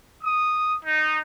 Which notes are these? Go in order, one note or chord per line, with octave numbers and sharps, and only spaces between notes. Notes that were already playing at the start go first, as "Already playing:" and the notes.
D#6
D#4